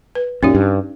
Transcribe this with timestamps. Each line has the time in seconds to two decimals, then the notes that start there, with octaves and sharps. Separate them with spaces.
0.15 B4
0.43 F#2 A#2 C#4 D#4 G4
0.55 G2